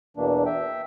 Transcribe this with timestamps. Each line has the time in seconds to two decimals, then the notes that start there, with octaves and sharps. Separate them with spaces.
0.17 E2 B2 E3 A#3 D4
0.46 E5 G5